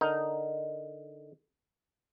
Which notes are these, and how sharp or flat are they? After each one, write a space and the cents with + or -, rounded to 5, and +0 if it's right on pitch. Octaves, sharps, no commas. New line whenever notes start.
D3 +0 D#4 +0 A#4 +0